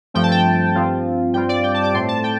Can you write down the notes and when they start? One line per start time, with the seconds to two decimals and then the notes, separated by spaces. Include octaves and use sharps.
0.14 G2 F3 A3 C4 G5
0.23 A5
0.32 G5
0.75 G2 F3 C4 F4
1.34 G2 G3 C4 F4 G5
1.49 D5
1.63 G5
1.74 A5
1.83 D6
1.94 A2 A3 C4 C6
2.08 A5
2.24 G5